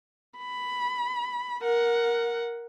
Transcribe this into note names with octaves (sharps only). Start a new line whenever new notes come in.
B5
A#4 F#5